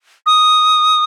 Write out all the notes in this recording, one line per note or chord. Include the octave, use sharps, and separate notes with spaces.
D#6